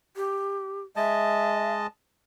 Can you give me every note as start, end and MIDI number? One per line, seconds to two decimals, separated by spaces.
0.16 0.81 67
0.96 1.87 56
0.96 1.87 75
0.96 1.73 76
0.96 1.87 81